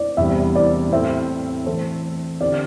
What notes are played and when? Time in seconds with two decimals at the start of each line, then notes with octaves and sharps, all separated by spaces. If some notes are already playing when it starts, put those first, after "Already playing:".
Already playing: D5
0.17 E2 C3 G3 E5
0.55 D5
0.92 A2 A3 C4 E5
1.66 E3 A3 C4 A4 C5
2.41 D3 C4 G4 D5